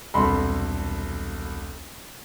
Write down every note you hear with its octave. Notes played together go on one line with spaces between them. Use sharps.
E1 C2 A4 B5 C6